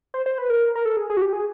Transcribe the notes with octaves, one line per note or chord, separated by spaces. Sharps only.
C5
C5
B4
A#4
A#4
A4
G#4
G#4
F#4
G4
G#4